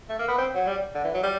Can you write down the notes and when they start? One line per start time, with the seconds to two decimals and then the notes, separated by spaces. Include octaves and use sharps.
0.10 A3
0.19 A#3
0.28 B3
0.38 C4
0.55 F#3
0.67 G3
0.95 D3
1.04 E3
1.14 F#3
1.23 G3